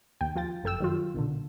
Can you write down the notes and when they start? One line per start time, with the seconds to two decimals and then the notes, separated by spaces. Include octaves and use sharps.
0.21 D#2 G5
0.36 F3 F4 G5 A6
0.63 G1 F#2 A4 G5 E6
0.80 D#3 F#3 F4
1.14 B1 A#2 D3